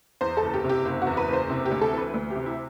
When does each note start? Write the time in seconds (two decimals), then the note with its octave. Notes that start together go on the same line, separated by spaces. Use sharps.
0.21 E2 C5
0.37 A4
0.43 F#1
0.54 G4
0.64 C3
0.69 G4
0.85 F#1
1.02 F#4
1.07 E2
1.17 B4
1.28 F#1
1.33 C5
1.50 C3
1.66 G4
1.71 D2
1.81 A4
1.92 E3
1.98 B4
2.14 D2
2.30 G4
2.35 C3
2.46 E4